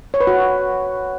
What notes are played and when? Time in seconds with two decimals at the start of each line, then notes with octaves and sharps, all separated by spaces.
0.14 C#5
0.20 B4
0.27 F#4